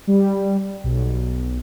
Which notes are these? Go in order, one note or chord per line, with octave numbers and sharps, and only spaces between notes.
G3
B1